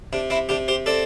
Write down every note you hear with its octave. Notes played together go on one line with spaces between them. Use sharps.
C3 D4
C4 E4
C3 D4 G4
G4 C5
C4 A4 D5